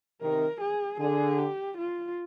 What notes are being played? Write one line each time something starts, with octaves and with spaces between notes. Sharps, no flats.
C3 D#3 A#4
G#4
D3 G#4
G4
F4